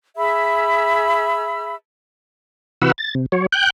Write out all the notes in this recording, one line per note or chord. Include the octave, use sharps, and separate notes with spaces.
G#4 E5 B5 E6
C3 E3 F#4 B4 F#5 E6
A6
C3
F#3 C#5
G5 F#6 G6